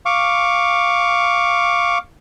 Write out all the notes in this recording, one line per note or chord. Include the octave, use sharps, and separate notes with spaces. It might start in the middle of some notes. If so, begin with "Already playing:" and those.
F5 C#6 D6